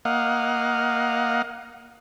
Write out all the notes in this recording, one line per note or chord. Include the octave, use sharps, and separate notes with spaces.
A#3 D#5 F5 F#5